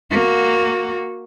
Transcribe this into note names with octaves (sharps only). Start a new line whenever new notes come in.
A#3 F#4